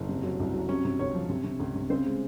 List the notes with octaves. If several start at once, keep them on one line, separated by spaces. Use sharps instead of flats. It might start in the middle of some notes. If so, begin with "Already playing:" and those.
Already playing: F#1
C3
F#3
C2
F#3
C3 C#4 C#5
C3
C#2 C#4 C#5
F3
C3
C3
C#2
C3
C#3 C4 C5
G#3